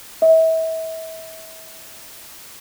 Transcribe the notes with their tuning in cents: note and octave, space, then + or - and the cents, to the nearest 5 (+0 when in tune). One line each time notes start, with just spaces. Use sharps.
E5 -35